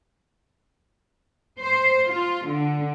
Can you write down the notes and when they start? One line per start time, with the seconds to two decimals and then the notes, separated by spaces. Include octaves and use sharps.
1.60 C5
2.07 F4
2.47 D3